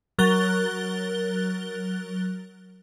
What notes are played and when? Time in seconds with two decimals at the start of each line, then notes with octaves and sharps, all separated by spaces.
0.18 F#3 A#4 F#6 A6 G7